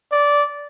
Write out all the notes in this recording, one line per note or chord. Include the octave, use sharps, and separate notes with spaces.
D5